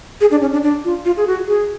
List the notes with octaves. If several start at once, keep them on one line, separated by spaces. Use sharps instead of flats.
G#4
D4
C#4
D4
D4
F4
F4
G#4
F#4
G#4